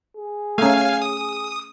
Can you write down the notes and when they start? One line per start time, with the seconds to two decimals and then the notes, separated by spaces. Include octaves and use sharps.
0.17 G#4
0.58 A3 C#4 F5 G#5
1.02 D#6